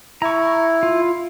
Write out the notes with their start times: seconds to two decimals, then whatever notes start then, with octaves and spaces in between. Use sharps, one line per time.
0.22 E4 A#5 C#6
0.83 F4